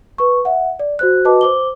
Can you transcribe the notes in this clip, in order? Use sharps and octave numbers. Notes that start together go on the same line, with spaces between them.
B4 C#6
E5 F#5
D5
F#4 C5 F#6
F#4 B4 D#5 A5 D6
C5 D6 G7